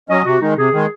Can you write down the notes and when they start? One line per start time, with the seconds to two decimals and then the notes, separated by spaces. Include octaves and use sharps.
0.09 F#3 C#4 D#5
0.25 C3 F#4
0.41 D#3 G#3 D#4
0.57 C3 G#4
0.73 D#3 G#3